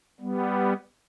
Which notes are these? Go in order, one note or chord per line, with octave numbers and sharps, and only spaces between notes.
G3 B3